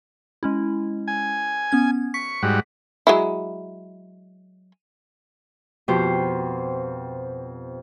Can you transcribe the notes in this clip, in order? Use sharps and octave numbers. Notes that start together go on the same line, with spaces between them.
G#3 C#4 E4
G#5
B3 C#4 G#6
C#6 B6
G#2 G3 F#4
F#3 G#3 E4
F2 B2 B3 G4 C5